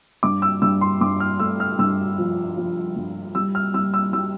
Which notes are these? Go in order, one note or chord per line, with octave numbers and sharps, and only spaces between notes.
G2 D6
E6
G2 E6
C6
G2 D6
F6
A3 E6
F6
G2 E6
F3
F3
G2
G3 E6
F6
G3 E6
E6
G3 E6